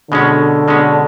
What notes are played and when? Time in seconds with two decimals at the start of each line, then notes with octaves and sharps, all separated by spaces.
0.11 B2 D3 G#3 C#4
0.68 B2 G#3 C#4